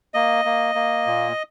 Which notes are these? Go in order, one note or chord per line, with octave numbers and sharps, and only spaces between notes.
A#3 D#5
A#3
A#3
A#2